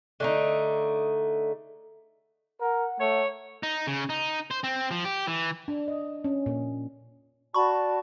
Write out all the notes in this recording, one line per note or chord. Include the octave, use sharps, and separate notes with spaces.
D3 A3 D#4
A#4 F#5
A3 C#5
D#4
C#3
D#4
C5
C4
F3
G4
E3
D4
D#5
C#4
A#2
F#4 D5 A5 B5 C#6